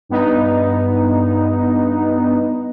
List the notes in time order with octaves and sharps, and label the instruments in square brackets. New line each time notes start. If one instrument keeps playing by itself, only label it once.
[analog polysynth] G2 B3 D#4